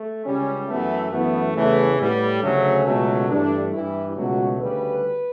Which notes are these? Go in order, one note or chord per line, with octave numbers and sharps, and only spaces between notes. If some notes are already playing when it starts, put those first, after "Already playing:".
Already playing: A3
C#2 C#3 G3 C#4
F#2 E3 A3 B3
F#2 E3 A3 B3
E2 C#3 E3 A3
A2 G3 B3
D2 C#3 F#3 A3 C#4
C#2 B2 F#3 A3
G2 E3 A3 D4
G2 E3 G3 E4
C#2 B2 F#3 A3 F#4
D2 C#3 G3 B4